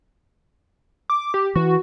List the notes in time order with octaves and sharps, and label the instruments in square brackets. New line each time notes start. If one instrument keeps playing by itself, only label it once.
[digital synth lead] D6
G4
[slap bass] E3 [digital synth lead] F#4